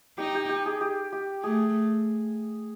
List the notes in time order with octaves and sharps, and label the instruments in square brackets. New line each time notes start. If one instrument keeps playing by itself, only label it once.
[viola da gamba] D#4 [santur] G4
[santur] G4
G4
G#4
G4
G4
[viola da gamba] A3 [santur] G#4